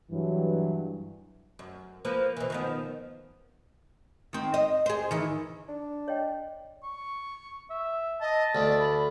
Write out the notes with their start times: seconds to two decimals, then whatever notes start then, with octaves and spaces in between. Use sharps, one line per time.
0.11 G2 E3 F#3
1.59 F#2
2.05 F3 A#3 B4
2.37 B2 E3
2.50 D#3 F3 B3
4.33 D#3 C4
4.54 D#5
4.86 G#4 C5
5.11 D#3 E3
5.68 D4
6.08 C#5 D#5 G5
6.83 C#6
7.70 E5
8.21 D#5 A5
8.55 D2 D5
8.80 B5